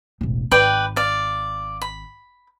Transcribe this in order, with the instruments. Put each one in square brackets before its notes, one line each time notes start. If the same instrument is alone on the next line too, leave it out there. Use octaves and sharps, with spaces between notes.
[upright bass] E1 A1
[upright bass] G#1 [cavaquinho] B4 D5 G5
[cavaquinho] D5 F5
B5